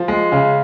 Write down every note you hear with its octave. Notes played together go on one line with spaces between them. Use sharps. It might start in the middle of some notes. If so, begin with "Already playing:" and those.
Already playing: F3
G#3
C#3